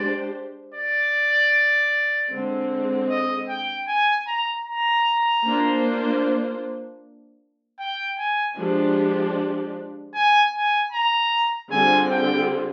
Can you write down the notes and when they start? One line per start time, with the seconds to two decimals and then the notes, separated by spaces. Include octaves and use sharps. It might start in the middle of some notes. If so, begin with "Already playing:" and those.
Already playing: G#3 D4 G4 C5 D5
0.74 D5
2.31 D3 G#3 C4
3.09 D#5
3.49 G5
3.87 G#5
4.27 A#5
4.65 A#5
5.44 A#3 D4 F4 C5
7.79 G5
8.18 G#5
8.58 F3 G#3 D4 G4
10.14 G#5
10.54 G#5
10.92 A#5
11.71 D3 G3 C4 F4 G#4 G#5
12.10 G5